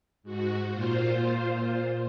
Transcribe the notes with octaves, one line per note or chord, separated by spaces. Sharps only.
G#2 F#4
A#2 F4 C5